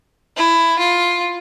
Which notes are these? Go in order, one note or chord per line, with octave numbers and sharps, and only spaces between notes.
E4
F4